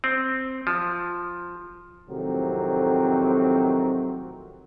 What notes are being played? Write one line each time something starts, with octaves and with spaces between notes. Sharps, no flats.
C4
F3
F2 A2 C3 D#3 F#3 C4